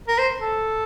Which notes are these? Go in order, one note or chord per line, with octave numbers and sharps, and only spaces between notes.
A#4
C5
A4